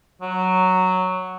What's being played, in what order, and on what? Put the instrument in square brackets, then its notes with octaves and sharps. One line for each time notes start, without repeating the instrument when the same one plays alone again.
[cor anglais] F#3